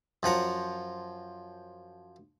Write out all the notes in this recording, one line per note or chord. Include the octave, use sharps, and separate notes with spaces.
F#2 F3 F#5 A#5